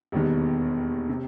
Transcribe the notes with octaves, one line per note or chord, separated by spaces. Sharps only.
E1 D#2 D#3 G3 B3
C3